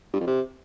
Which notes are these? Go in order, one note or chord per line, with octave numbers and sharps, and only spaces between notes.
G2
F2
C3